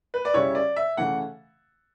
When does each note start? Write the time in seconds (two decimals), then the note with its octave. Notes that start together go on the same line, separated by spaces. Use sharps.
0.14 B4
0.25 D5
0.34 C#3 G3 C#4 E4 C#5
0.55 D5
0.76 E5
0.97 C#3 E3 A3 F#5